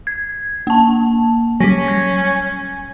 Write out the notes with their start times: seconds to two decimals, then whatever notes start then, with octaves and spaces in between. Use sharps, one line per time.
0.07 G#6
0.67 A#3 A5
1.60 F#3 G3 C#4 A#6 B6
1.88 G#6